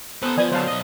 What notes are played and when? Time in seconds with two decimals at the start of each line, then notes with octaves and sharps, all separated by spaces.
0.22 B3 A4 B4 C5 D#6
0.38 F3 B4 D5 G#5 D#6
0.52 D3 F#3 C5 C#5 F5 A5
0.68 B1 D#5